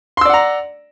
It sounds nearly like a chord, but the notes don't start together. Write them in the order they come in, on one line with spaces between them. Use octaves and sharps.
C6 E6 D5 F#5 A#5